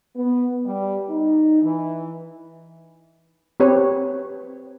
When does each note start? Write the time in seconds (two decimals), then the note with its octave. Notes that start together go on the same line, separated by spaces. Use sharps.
0.16 B3
0.66 G3
1.09 D#4
1.62 E3
3.60 C4 G4 B4 C#5